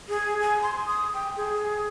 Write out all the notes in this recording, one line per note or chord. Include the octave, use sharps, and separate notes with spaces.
G#4
G#5
C6
D#6
G5
G#4
G#4